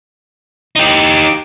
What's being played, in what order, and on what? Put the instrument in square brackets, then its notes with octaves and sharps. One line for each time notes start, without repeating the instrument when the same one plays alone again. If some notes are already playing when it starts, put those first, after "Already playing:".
[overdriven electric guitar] D#4 G4